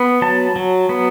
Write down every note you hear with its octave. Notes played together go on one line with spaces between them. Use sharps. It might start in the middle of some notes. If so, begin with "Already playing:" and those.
Already playing: B3
F#3 A5
F#3
B3